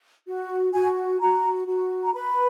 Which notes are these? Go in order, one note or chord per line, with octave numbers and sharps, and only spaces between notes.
F#4
F#4 G#5
F#4 A#5
F#4
A#5
B4 B5